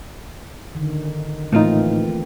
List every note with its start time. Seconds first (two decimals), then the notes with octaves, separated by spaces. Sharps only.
0.75 D3 D#3
1.53 A2 E3 F3 A3 A#3 C4 D#4 F4